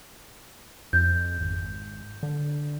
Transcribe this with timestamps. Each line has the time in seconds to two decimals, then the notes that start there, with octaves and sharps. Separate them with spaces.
0.93 F2 G6
1.41 G#1
2.23 D3